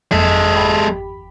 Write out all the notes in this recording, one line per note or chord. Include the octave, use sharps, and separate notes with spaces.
G1 F2 G#3 A4 B6
G#1 G4 B5